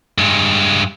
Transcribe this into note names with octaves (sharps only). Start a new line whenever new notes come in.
G2 G#3